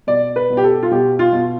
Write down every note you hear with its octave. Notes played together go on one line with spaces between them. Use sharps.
B2 D5
B4
B2
G4
A4
F4
B2 G4
F4
B2